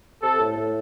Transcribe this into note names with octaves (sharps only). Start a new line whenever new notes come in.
C3 A4
A2
A2